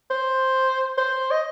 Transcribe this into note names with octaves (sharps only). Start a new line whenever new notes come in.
C5
C5
D#5